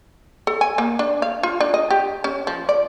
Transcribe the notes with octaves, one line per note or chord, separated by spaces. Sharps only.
A4
G#5
A#3
D4
F5
F4
D4
D#5
G4
C#4
F3
D5